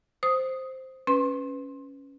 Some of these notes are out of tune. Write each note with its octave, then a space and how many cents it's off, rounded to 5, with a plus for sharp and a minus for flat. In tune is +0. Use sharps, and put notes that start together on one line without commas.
C5 +0 D#6 +0
C#4 +0 B4 +10 C6 +25